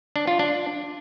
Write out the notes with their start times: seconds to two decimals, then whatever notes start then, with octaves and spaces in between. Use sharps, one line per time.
0.16 D4
0.27 F4
0.39 D4